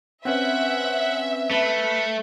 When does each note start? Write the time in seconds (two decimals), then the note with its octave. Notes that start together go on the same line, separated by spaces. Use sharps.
0.25 C4 C#4 B4 E5 F#5
1.51 A3 B4